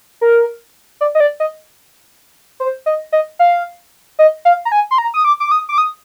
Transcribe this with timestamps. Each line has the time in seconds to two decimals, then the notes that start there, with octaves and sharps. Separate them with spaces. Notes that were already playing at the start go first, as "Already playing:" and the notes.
0.21 A#4
1.01 D5
1.15 D#5
1.20 D5
1.40 D#5
2.60 C5
2.86 D#5
3.12 D#5
3.39 F5
4.19 D#5
4.45 F5
4.65 A#5
4.72 G#5
4.91 C6
4.98 A#5
5.14 D#6
5.25 D6
5.40 D6
5.52 D#6
5.69 D6
5.78 D#6